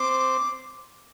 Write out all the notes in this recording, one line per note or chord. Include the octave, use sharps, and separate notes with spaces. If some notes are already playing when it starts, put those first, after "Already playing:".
Already playing: C4 C5 D6